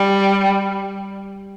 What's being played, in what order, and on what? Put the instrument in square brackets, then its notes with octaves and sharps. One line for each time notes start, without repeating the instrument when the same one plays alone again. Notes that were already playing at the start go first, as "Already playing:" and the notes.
Already playing: [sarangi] G3